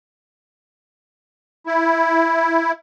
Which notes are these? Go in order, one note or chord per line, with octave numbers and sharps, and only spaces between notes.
E4